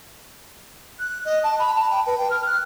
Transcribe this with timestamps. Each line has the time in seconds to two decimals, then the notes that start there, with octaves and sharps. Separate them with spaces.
0.99 F#6
1.25 D#5
1.43 A5
1.59 B5
1.75 A5
1.90 G5
2.06 B4
2.17 G5
2.30 F6
2.46 F#6